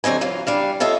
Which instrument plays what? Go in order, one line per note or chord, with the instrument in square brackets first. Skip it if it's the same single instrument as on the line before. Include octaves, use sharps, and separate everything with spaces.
[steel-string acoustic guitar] D3 F#3 C4 D#5 G#5
E3 F#3 F4
G3 D4 F5
F4 A4 C#5 D#5 E5